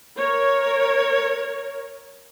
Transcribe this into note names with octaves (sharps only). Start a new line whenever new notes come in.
A#4 C#5